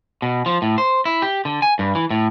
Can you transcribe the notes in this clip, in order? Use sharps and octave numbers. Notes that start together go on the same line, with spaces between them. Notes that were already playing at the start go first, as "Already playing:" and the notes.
B2
F3
A2
C5
E4
G4
D3
G#5
G2
E3
A2